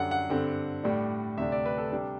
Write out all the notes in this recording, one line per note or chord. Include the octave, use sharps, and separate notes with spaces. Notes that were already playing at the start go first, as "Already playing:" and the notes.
Already playing: F#2 D3 G3 F#5
F#5
G2 D3 G3 C4
A2 G3 D4
D2 C3 G3 D4 E5
D5
B4
A4
C3 G3 D4